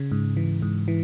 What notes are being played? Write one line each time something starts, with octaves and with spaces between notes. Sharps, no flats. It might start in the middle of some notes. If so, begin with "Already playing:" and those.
Already playing: C#3
G#2
E3
G#2
E3